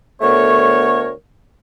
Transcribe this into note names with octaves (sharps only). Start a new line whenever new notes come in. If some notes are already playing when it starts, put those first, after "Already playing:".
D2 A3 B3 A#4 C#5